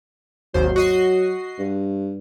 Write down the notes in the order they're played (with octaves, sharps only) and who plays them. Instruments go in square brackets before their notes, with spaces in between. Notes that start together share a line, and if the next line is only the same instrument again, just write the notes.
[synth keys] G#1 D#2 C5 [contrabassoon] F#3
[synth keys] F#4 D#5 C7
[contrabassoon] G2